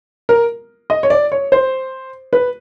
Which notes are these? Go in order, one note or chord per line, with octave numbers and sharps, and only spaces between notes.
A#4
D#5
C#5
D5
C#5
C5
B4